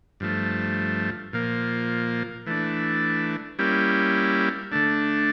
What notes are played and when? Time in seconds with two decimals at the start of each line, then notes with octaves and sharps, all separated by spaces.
0.20 G2 F3 A3
1.33 A#2 F3 A#3
2.46 E3 A3 D4
3.59 G3 A#3 C#4 E4 G4
4.72 D3 A3 D4